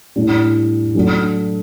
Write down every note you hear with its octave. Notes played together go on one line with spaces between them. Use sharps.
A2 G3 D4
F#3 A3 D4 F#4